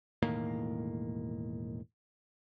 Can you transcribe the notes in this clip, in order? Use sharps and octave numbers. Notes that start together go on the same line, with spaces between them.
E1 A2 D#3 A#3